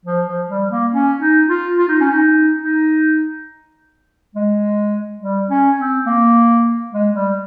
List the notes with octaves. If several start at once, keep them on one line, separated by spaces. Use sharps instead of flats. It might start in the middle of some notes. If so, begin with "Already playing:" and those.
F3
F3
G3
A#3
C#4
D#4
F4
F4
D#4
C#4
D#4
D#4
G#3
G3
C#4
C4
A#3
G#3
G3